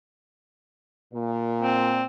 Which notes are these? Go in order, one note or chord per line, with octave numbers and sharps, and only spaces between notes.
A#2
C4